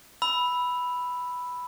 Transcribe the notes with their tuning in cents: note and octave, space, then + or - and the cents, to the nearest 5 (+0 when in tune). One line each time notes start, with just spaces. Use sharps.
B5 +0 E6 +0